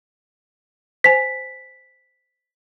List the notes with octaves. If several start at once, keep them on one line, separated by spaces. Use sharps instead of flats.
C5 G#5 B6